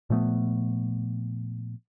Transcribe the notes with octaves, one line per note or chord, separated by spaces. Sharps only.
A#2 F3 A3 B3